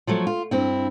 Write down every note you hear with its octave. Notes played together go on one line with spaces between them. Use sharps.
F3 F#3 A3
F4
G2 C4 E4